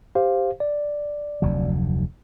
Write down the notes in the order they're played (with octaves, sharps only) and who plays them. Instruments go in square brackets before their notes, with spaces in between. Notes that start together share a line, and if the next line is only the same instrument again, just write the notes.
[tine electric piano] G4 C5 F5
D5
[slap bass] F1 D2 F#3